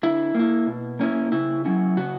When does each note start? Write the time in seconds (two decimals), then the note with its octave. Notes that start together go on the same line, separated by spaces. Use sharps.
0.03 D3 E4
0.35 A#3 E4
0.67 B2
1.00 A#3 C#4 E4
1.32 C#3 E4
1.65 F#3 C#4 E4
1.97 C#3 F#4